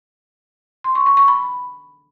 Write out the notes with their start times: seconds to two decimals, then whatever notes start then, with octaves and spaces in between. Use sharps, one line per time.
0.84 C6
0.95 C#6
1.06 C#6
1.17 C#6
1.28 B5